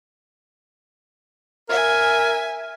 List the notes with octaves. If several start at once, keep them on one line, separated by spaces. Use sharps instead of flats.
A#4 E5 G#5